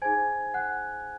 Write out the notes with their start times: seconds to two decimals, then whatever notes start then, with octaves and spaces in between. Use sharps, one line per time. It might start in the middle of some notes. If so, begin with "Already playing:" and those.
0.02 D#4 G#4 C5 G#5 G#6
0.54 F#5 F#6